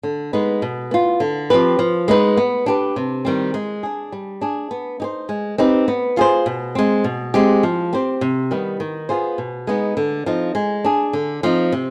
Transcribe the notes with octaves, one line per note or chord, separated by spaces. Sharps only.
D3
G#3 B3 D#4 B4
B2
B3 F4
D3
F3 C4 G4 B4
F3
G#3 B3 D#4 B4
B3
D4 G4 B4
C3
D#3 G3 C4
G#3
D4 G#4
G3
D4 G#4
B3
D#4 G4 C5
G#3
C4 D#4 G4 B4
B3
F4 G#4 C5
B2
G#3 C4
B2
G#3 C4 G4
F3
C4 G4 C5
C3
D#3 G3 B3
D#3
B3 F4 G#4 C5
B2
G#3 B3 D#4
D3
F3 C4 D#4
G#3
D4 G#4
D3
F3 C4 D#4
C3